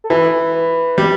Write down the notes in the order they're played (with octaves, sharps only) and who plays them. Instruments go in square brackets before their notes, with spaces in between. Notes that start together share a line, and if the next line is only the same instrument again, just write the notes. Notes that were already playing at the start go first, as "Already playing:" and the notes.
[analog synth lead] A4
[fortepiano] E3 [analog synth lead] B4
[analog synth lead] B4
[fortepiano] G3 [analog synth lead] D5